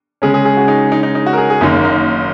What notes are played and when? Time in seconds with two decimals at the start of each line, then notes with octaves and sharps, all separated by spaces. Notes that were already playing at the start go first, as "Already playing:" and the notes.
0.22 C#3 G#3 C#4 G#4
0.34 G#4
0.45 G#4
0.57 F#4
0.68 D#4
0.92 D#4
1.03 D#4
1.15 D#4
1.26 F#4
1.33 A#4
1.38 G#4
1.50 G#4
1.61 F#1 F#2 D#3 D#4
1.73 A#3
1.84 D#4